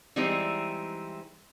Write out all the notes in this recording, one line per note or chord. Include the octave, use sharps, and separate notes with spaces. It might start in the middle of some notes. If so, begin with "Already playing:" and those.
E3 G3 G#3 C4 D#4 E4